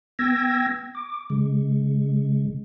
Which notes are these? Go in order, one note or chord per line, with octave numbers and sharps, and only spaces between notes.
B3 G5 E6 G#6 A#6
D6
C#3 G#3